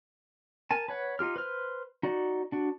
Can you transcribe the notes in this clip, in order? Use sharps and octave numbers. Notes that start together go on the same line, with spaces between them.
A#4 G#5 A5
B4 C#5 F#5
D#4 F4 G4 F6
B4 C5 F6
D#4 F#4 D5
D4 F#4